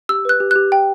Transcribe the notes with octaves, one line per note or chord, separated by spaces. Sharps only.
G4 E6
B4 F#6
G4
G4 F#6
G5